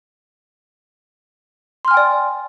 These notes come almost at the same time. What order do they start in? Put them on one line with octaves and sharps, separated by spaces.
C6 F6 G#5 G5 D5